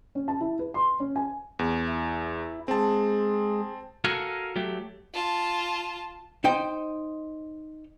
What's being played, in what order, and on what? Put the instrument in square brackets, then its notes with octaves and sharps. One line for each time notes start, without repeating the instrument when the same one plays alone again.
[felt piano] C#4
A5
E4
B4
C6
C#4
G#5
[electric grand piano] E2
[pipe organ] E4
[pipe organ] G#3 G#4 [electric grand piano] C4 A5
[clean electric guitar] F#4 A4 A#4 F5 F#5 G#5
F#3 A3 G4
[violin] F4 A5
[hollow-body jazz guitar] D#4 C5 G5